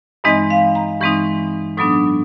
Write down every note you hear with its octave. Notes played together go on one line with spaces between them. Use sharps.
G2 E3 G#3 C4 D#4 D#5
F5
A#5
G2 E3 G#3 C4 D#4 C#6
A2 F#3 B3 D4 D#6